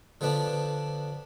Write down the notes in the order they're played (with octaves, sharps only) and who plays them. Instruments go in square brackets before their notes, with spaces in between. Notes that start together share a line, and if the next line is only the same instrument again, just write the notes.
[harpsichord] D3 F3 B3 D4